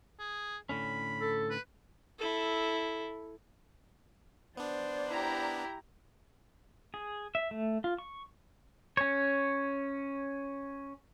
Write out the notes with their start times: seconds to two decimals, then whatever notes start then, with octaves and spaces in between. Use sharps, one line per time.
0.19 G#4
0.69 A2 D3 C#4 B5
1.21 A4
1.50 B4
2.19 E4 A4
4.57 B3 D4 C5 D5
5.09 E4 G4 A#5
6.94 G#4
7.35 E5
7.51 A3
7.84 F4
7.98 C#6
8.97 C#4 C#5